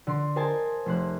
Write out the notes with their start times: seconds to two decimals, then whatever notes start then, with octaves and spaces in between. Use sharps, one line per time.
0.07 D3 C6
0.36 A#4 C5 D#5 G#5 A5
0.86 F1 C5 F#6